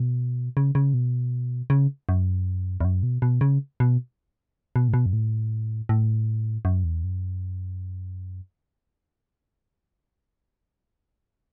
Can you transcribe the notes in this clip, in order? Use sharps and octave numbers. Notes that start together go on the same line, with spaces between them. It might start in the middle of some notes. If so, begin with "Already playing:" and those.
Already playing: B2
C#3
C#3
B2
C#3
F#2
E2
F#2
B2
B2
C#3
B2
B2
A2
B2
F#2
A2
A2
F#2
E2
F#2